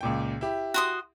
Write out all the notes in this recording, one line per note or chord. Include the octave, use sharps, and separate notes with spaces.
C#2 A#2 G5
E4 G4
F#4 C6 D#6